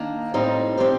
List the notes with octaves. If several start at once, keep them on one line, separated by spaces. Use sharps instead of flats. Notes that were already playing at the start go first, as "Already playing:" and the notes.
Already playing: D#3 A#3 D4
A2 G3 C4 D#4
F3 C4 G4 C5